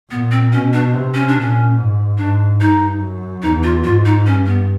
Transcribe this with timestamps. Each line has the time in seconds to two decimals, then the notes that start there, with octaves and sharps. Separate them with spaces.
0.11 A#2 B3
0.32 C4
0.52 B2 C#4
0.73 D4
0.94 C3
1.14 C#4
1.28 D4
1.35 A#2
1.40 C#4
1.77 G#2
2.18 G#2 D4
2.60 G2 D#4
3.01 F#2
3.43 E2 D#4
3.63 F4
3.84 G#2 F4
4.05 D#4
4.26 G2 C#4
4.46 B3